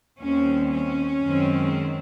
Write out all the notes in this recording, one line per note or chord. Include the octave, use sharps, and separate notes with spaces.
D#2 D#3 G3 C4 C#4
C#4
F#2 D#3 G#3 C4